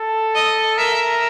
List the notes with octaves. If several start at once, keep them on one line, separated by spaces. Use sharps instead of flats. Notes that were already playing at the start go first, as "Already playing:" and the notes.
Already playing: A4
D#5
A#4 E5